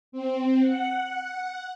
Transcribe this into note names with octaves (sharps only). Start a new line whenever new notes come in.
C4
F#5